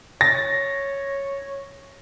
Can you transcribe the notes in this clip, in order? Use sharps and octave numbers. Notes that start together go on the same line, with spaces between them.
C#5 A6 A#6